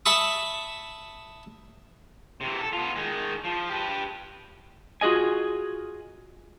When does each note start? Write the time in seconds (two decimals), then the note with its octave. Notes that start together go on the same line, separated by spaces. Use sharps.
0.06 E5 A5 B5 C#6 D#6
2.41 C3 E3
2.60 A4
2.73 B3 F4
2.96 D#3 G#3
3.44 F3
3.70 G4 B4
5.01 F4 F#4 G#4 D#5 G#5